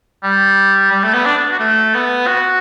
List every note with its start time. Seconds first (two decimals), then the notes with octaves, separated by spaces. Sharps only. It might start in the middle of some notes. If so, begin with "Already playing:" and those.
0.23 G3
0.92 G3
1.03 A3
1.14 B3
1.26 D4
1.51 F#4
1.59 A3
1.94 B3
2.27 F#4